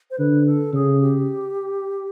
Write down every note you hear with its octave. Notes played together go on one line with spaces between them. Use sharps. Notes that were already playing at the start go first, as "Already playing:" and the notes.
C5
D3 B4
A4
C#3 G#4
G4